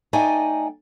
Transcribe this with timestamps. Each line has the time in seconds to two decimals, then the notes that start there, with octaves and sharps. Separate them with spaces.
0.13 A3 D#4 D5 D#5 G5 G#5